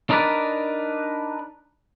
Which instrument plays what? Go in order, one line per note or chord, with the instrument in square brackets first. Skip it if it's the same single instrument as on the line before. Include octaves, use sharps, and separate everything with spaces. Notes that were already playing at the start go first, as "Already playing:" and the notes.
[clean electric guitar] D4 D#4 A#4 B4 D5